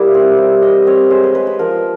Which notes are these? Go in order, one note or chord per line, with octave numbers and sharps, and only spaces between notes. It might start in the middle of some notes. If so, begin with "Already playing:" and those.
Already playing: G3 A#3 E4 D5
C4
G3
C4 D#5
C4 C#5
G#3 C5
B4
G#3 B4
B4
F3 A#4